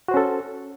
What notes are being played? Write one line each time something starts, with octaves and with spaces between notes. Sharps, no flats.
C#4 F#4 A4 C5